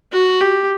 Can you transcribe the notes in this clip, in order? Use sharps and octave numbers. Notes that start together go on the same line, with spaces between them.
F#4
G4